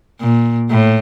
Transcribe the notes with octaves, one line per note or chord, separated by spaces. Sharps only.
A#2
A2